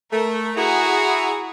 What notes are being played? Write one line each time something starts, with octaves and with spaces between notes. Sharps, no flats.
A3 A#4
E4 F#4 G#4 A#5